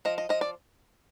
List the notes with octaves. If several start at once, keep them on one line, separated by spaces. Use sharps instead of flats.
F3 D#5
D#5
F3 D#5
D5